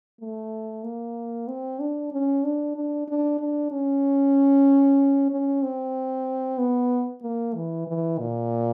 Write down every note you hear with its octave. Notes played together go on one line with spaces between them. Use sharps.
A3
A#3
C4
D4
C#4
D4
D4
D4
D4
C#4
C#4
C4
B3
A#3
E3
E3
A#2